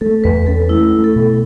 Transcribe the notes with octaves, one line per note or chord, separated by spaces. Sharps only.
A3 A4
E2 B4
C#4 A4
A3 E4
A3
A4
B2